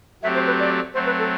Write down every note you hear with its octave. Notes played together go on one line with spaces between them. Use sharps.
F#3 A3 C4 G4 E5
C5
B4
D5
F#3 A3 C4 C5
B4
A4